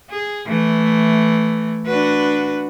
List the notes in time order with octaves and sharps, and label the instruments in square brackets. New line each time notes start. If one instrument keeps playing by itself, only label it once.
[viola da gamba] G#4
E3 A3
D4 F#4 B4